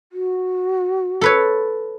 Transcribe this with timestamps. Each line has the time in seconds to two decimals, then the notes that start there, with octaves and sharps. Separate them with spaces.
0.12 F#4
1.21 A4 B4 C#5